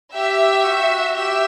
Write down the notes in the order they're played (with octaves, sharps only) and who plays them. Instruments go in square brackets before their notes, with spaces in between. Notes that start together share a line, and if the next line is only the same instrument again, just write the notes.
[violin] G4 [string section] E5
[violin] F#4
[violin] G4 [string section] E5